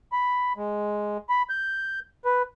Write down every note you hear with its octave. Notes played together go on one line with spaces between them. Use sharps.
B5
G#3
B5
G6
B4